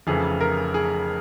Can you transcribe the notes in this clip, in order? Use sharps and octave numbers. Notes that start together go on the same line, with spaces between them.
F1 F2 C#3 E3 G#4
A#4
G#4